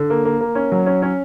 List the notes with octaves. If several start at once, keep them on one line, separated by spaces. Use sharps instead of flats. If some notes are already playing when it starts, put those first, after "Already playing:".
Already playing: D3
A#3
A#3
A#3
C#4
F#3
C#4
C#4